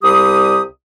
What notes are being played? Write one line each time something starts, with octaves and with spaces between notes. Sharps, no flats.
C2 G3 G4 D#6